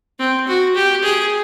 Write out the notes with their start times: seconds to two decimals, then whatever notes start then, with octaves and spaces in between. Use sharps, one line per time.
0.19 C4
0.48 F#4
0.75 G4
1.03 G#4